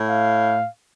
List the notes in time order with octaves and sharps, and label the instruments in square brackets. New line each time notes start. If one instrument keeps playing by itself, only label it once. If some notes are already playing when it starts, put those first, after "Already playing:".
Already playing: [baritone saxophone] A2
[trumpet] F5